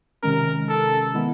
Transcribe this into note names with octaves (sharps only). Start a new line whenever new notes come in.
C3 D#3 G#3 C#4 A#4
A4
D#3 G#3 B3 E4